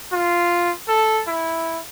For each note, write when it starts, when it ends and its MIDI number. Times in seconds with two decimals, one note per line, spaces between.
0.12 0.71 65
0.88 1.22 69
1.27 1.79 64